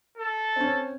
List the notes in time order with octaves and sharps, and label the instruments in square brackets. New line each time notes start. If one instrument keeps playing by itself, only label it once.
[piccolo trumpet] A4
[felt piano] C4 C#4